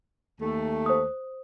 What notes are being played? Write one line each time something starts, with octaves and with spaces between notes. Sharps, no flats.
D#2 A3
C5 D#6